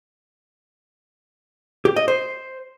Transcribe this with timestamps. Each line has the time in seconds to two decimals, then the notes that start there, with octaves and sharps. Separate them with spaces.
1.85 G4
1.96 D#5
2.08 C5